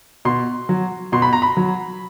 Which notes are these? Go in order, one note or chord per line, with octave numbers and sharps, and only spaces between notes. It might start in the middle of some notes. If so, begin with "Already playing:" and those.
B2 C6
F#3
B2 C6
B5
A#5
B5
F#3